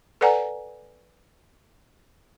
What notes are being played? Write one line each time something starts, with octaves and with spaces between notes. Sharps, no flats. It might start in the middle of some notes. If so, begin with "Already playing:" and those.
A4 B4 D5 F#5 G#5 A#5